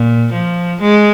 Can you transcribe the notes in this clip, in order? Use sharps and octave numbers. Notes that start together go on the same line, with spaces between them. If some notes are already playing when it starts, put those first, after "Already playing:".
Already playing: A#2
F3
G#3